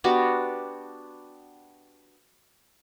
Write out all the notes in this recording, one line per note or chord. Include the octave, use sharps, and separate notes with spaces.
B3 D4 F#4 G4